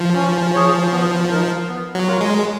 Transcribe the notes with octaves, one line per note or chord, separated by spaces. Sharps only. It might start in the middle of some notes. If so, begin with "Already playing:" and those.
Already playing: F3
C#4
G#4 C#5
B3
D#4 A#4
B3
F#3
F4 A#4 C#5
G#3